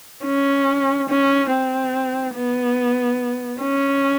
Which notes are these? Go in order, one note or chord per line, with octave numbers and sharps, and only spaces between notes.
C#4
C#4
C4
B3
C#4